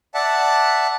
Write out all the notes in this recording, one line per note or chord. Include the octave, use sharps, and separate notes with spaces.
D5 E5 F#5 A5